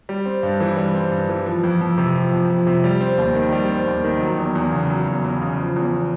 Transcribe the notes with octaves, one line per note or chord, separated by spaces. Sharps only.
G3
C4
G2
E3
G3
C4
G2
E3
F3
F2
F2
C3
F3
F2
F2
C3
G3
C4
D#2
D#3
G3
C4
D#2
D#3
F#3
E2
E2
C#3
F#3
E2
E2
C#3
F3
E2